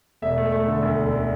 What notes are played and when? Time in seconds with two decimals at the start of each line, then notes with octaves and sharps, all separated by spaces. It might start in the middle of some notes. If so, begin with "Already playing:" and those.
0.22 E1 E5
0.38 A3
0.52 A3
0.68 D3
0.83 D2
0.98 E1
1.13 D3